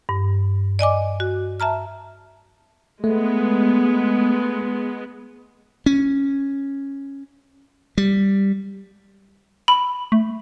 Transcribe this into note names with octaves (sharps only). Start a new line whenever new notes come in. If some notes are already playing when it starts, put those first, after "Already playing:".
G2
D5 D#5 G#5 D6
F#4
E5 A5 A#5 F6
G#3 A3 B3
C#4
G3
B5
A3